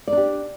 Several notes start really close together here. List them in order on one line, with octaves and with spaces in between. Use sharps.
D5 D4 G4